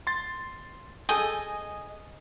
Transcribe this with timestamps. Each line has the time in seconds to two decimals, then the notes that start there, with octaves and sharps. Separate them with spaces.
0.07 C6 A6
1.09 G#4 A4 D#5 G5 G#5